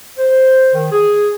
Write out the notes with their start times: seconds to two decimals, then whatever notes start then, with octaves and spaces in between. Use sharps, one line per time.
0.18 C5
0.74 D#3
0.92 G#4